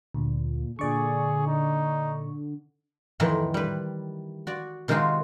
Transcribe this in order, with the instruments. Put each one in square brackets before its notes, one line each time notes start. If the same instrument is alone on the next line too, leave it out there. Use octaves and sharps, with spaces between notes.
[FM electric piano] D2 [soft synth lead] A#2
[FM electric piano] A#2 D5 C#6 [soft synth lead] D3 [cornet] G#4
[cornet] D#4
[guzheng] F2 A2 D#3 E3
G3 B4
F#4 D5
C3 D#3 G#3 D#4 F4 F#4